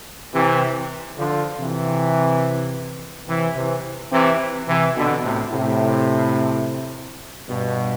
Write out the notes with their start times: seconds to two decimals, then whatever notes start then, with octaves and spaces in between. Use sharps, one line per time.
0.34 C3 E3
1.18 D3 F3
1.60 C3 E3
3.28 C3 E3
3.56 C3 E3
4.12 C3 E3
4.68 C3 E3
4.97 B2 D3
5.24 A2 C3
5.52 A2 C3
7.48 G2 B2